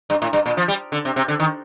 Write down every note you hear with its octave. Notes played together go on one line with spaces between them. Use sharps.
G2
A2
G2
A#2
F3
G3
D3
C3
C3
D3
D#3